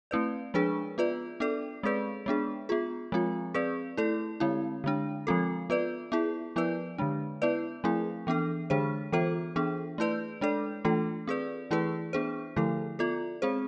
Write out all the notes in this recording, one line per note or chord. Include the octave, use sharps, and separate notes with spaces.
A3 C4 E4 B4 D5
F3 G#3 D4 G#4 B4
B3 F4 B4 D5
B3 D4 A4 D5
G#3 C4 G#4 B4 D5
G#3 B3 D4 G#4
B3 F4 G#4
F3 G#3 C4 F4
C4 G#4 B4 D5
A3 E4 A4 D5
D3 G#3 C4 E4
D3 G#3 D4
F3 G#3 C4 F4 A4
B3 F4 B4 D5
B3 E4 G#4
F3 B3 E4 B4 D5
D3 G#3 D4
B3 E4 B4 D5
F3 A3 C4 E4 G#4
E3 B3 D4 A4
D3 G#3 D4 G#4 C5
E3 B3 F4 A4 C5
E3 B3 D4 G#4
A3 E4 B4 D5
G#3 D4 A4 D5
E3 A3 D4 F4 A4
C4 G#4 B4 D5
E3 A3 E4 G#4 B4
B3 D4 G#4 C5
D3 F3 A3 E4 A4
B3 F4 A4 D5
G#3 C4 G#4 C5